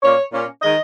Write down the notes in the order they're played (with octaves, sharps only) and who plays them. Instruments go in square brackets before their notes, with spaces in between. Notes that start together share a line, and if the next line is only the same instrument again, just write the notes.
[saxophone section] A#2 A#3 C#4 C#5
A#2 A#3 C#4
D#3 G#3 D#5